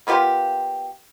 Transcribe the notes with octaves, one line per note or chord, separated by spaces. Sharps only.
A#3 B3 F4 G4